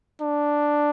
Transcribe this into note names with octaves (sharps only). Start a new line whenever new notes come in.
D4